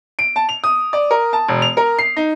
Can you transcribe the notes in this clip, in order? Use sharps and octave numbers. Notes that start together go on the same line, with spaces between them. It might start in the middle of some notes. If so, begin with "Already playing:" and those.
D7
A5
F7
D#6
D5
A#4
A5
E1
F7
A#4
C7
D#4